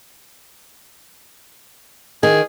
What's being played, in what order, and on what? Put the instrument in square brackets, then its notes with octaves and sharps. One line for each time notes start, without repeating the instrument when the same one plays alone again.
[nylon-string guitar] D#3 [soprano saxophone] G#4